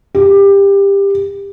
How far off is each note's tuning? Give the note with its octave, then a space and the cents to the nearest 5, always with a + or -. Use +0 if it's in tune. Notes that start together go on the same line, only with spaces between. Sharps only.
G4 +20